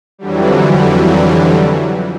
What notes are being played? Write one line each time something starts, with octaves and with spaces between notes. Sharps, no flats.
F2 D3 E3 F#3 G3